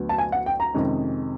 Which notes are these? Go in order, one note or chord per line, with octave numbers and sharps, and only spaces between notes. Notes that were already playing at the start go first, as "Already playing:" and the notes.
Already playing: D2 D3 F#3 B3
A5
G#5
F#5
G5
A#5
F2 C3 D#3 G#3 C#4